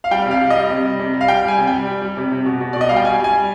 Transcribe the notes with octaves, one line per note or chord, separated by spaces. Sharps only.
F5
G3 G5
C3
F5
G3
D#5
G3
C3
G3
C3
G3
F5
G3 G5
G3 G#5
C3
G5
G3
G3
G3
C3
C3
B2
B2
B2 D5
D#5
G3 F5
G5
G3 G#5
G3 G#5
G3